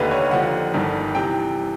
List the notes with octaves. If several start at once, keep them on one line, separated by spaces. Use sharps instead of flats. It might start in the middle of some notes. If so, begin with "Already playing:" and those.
Already playing: F1 D#2 D3 B4
C#5
D#2 D3 F3 F#5
G1 G2 D#3
C3 E3 G5